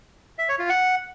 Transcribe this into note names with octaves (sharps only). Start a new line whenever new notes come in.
E5
C#5
F4
F#5